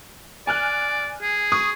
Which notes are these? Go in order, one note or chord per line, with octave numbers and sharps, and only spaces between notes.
D5 G#5 F6 F#6
G#4
C#6 D#6